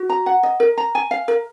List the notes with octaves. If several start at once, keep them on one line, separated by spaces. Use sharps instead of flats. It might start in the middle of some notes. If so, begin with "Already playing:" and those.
Already playing: F#4
A#5
F#5
D#5
A#4
A#5
G#5
F5
A#4